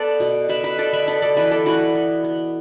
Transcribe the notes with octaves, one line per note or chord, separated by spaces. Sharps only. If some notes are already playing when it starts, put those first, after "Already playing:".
Already playing: B3 A4 B4 D5
B2
B2 B4 E5
B4 E5
B3 A4 D5
B4 E5
B3 A4 D5
A4 D5
E3 B4 E5
A4 D5
E3 F#4 B4
B3
B3